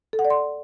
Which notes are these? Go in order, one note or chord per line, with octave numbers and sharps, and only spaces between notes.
A4
F#5
D5
C6